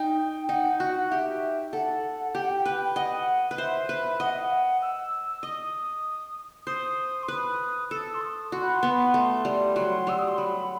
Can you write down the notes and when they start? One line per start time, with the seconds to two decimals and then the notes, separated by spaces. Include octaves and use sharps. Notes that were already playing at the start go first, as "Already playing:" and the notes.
Already playing: D#4 G5
0.49 D#4 F#5
0.80 F#4 F#5
1.11 G4 E5
1.73 A4 F#5
2.35 G4 G5
2.42 F#5
2.50 G5
2.65 B4
2.84 G5
2.96 D#5 F#5
3.51 B4
3.58 C5 E5
3.89 B4
4.20 D#5 F#5
4.30 E5
4.40 F#5
4.82 E6
5.43 D#5 D#6
6.67 C5 D#6
7.23 C6
7.28 B4 D#6
7.90 A4 E6
8.14 C6
8.21 D#6
8.52 F#4 C6
8.63 B5
8.74 C6
8.83 B3
9.14 A3
9.45 G3
9.76 F#3 C6
10.07 G3 E6
10.19 D#6
10.28 C6
10.38 F#3 B5